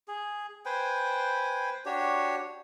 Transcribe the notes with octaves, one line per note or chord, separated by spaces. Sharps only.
G#4
B4 C5 G5 G#5
D4 F#4 G4 C#5